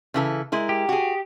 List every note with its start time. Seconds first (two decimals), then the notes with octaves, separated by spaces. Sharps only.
0.14 C#3 E3 A4
0.52 G#3 E4 A#4
0.69 G4
0.89 F#4 G#4